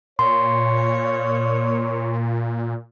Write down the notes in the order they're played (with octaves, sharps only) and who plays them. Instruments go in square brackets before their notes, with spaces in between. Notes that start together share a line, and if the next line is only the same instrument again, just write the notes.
[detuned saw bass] A#2 [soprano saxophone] C#5 [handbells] C6